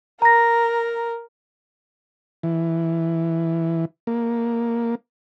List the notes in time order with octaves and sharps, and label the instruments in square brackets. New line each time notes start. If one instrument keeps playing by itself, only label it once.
[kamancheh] A#4 [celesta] A#5 A#6
[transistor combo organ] E3
A#3